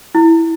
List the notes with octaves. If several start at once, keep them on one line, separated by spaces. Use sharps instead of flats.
E4